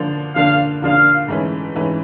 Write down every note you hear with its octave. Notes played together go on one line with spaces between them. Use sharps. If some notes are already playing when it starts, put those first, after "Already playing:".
Already playing: D3 F3 A#3 D4
D3 F3 A#3 D4 F5
D3 F3 A#3 D4 F5
G#2 E3 A3 C#4
G#2 E3 A3 C#4